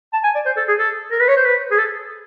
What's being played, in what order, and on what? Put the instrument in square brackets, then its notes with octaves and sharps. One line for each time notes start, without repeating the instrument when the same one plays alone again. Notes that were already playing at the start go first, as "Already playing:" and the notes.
[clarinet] A5
G#5
D5
C5
A4
G#4
A4
A#4
B4
C#5
C5
B4
G#4
A4